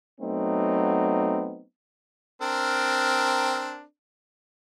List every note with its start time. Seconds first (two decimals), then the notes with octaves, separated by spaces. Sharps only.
0.20 F#3 A3 B3 C4 D#4
2.42 C4 D4 A#4